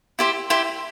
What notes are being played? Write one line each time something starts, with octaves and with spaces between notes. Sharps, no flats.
E4 G4 C5
E4 G4 C5